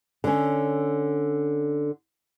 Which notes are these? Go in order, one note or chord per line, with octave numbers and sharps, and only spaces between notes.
D3 C#4